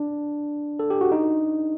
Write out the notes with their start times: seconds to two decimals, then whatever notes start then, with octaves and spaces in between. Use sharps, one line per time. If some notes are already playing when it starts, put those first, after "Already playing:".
Already playing: D4
0.79 A4
0.90 G4
1.01 F#4
1.12 D#4